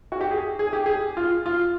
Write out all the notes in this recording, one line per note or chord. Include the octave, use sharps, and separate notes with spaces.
F#4
G4
G#4
G#4
G4
G#4
F4
F4